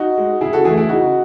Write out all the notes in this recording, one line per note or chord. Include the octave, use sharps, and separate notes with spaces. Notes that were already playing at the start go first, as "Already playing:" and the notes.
Already playing: D#4 F#4
G#3
C#3 E4 G#4
F#4 A4
E3 A3 E4 G#4
E4 G#4
C#3 D#4 F#4